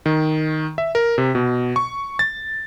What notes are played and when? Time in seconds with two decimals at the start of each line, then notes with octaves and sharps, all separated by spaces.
0.06 D#3
0.78 E5
0.95 A#4
1.18 C3
1.35 B2
1.76 C#6
2.19 A6